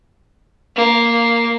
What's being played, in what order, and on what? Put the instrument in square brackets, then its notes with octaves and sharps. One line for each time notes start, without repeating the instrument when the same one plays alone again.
[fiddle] A#3